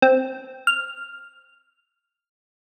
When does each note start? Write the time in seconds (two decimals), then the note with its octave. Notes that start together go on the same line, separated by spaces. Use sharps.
0.02 C4
0.67 F6